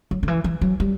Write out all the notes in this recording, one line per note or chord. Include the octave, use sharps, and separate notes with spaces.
F#3
D3
E3
E3
F#3
G3